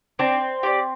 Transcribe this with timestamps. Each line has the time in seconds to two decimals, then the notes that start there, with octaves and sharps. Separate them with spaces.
0.19 C4 D4
0.63 G4 D5